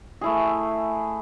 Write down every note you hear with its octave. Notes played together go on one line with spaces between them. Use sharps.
A3 E4 G#4